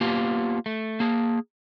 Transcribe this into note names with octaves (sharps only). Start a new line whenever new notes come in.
A#3 B3 F4 G4
A3
A#3 G#4